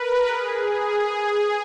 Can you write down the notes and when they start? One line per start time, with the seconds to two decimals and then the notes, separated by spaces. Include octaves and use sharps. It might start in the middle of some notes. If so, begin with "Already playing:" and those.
Already playing: A#4 B4
0.26 G#4